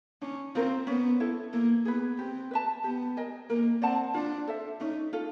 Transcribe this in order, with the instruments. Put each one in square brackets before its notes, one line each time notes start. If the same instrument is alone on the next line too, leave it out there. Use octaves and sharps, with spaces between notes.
[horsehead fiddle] C#4 [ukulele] D4
[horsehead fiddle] C4 [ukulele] F4 A#4
[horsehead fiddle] B3 [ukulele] C#4
[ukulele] E4 A4
[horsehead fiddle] A#3 [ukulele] E4
[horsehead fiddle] B3 [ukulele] G#4 B4
[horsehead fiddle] C4 [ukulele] G4
[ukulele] B4 E5 A5
[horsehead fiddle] B3 [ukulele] G4
[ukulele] A#4 D#5 G#5
[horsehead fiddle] A#3 [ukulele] A#4
[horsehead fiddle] C4 [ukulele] D5 F#5 A5
[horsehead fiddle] D4 [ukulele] F4
[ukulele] A4 C5 E5
[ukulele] C#4 [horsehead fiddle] D#4
[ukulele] F4 A4